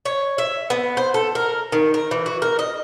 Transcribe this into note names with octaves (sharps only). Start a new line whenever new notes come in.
C#5
E5
B3
C5
A4
A#4
D#3
A#4
E3
F#4
A#4
D#5